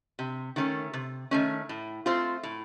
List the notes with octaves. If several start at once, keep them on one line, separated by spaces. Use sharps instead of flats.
C3
D#3 A3 C#4
C3
D#3 A3 C#4
A2
A3 C4 F4 C5
A2